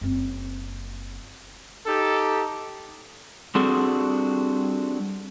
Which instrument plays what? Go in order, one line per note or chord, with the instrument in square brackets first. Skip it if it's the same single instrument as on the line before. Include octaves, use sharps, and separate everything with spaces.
[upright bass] F#1 C4
[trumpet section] D#4 G4 A4
[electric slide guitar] G3 C4 D4 F#4 G#4 A4